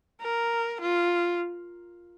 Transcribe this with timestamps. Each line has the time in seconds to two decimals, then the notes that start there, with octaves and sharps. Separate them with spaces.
0.21 A#4
0.81 F4